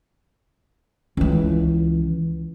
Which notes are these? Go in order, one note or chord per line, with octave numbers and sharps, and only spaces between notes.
C#2 E3